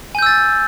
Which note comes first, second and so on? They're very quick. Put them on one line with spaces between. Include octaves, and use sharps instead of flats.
G#5 G6 E6 A6